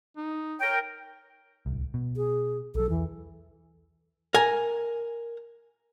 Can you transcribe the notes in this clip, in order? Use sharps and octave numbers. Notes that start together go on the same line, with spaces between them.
D#4
A#4 C#5 G5
D1 C2
B2
G#4
B1 F#3 A4
E2 E3
A#4 G#5